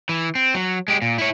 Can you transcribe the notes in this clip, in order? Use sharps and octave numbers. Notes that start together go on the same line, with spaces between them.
E3
C4
F#3
G#3 G4
A#2
E4 C#5